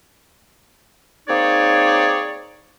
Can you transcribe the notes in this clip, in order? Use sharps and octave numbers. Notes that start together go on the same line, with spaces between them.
A#3 C4 D#4 G#4 C#5 D5